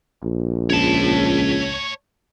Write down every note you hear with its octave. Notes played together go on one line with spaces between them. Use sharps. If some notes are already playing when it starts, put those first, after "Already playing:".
A#1
C#2 C#5 A5